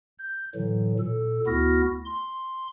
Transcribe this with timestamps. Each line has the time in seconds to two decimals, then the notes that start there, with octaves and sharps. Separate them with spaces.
0.18 G6
0.55 A2 D3 E3 F#3
1.00 A#2 A4
1.47 D2 B3 E4 F#4 F6 A#6
2.05 C6